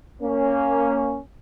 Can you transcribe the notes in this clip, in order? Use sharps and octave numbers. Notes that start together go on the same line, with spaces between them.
A#3 C#4